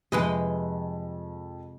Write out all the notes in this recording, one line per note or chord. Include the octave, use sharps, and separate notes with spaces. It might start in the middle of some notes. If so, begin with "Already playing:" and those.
F2 C3 G#3 B4 D#5